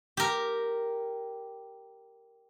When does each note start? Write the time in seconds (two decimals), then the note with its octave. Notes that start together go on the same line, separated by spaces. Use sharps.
0.17 G4 A#4